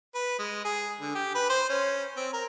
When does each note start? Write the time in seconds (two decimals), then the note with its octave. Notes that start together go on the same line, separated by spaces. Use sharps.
0.15 B4
0.39 G#3
0.65 G#4
1.01 D3
1.15 G4
1.35 B4
1.50 C5
1.70 C#4
2.17 C4
2.33 A#4